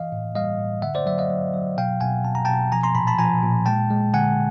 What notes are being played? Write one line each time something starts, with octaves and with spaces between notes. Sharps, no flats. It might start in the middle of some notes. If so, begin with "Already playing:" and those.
Already playing: E3 D#5 F5
A2
G3 D#5 F5
A2
D3 E5 F#5
C5 D5
F#3 D5 E5
D#5 F5
F#3
F#3
B2 F5 G5
B2 F#5 G#5
B2 A5
A#5
B2 G5 A5
F3 G#5 A#5
A#5 C6
A#2 A5 B5
A5 B5
F3 G#5 A#5
A#2
G#3 G5 A5
G#3
D3 F#5 G#5